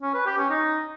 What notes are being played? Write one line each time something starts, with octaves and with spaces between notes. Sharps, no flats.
C#4
B4
G4
C#4
D#4